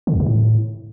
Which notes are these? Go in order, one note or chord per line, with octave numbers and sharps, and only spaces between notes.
D3
E2
C3
A2